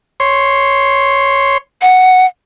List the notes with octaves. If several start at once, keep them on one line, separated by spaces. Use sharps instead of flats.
C#5 C6
F#5